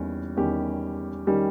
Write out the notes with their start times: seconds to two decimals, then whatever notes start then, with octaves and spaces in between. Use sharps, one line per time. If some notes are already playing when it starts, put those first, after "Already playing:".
Already playing: E2 D#3 G3 C#4
0.37 E2 D#3 G3 C#4 G4
1.27 D#3 G3 C#4 G4